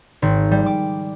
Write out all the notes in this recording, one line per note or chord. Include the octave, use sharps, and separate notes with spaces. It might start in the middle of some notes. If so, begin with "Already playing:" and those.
G#1
G3
D6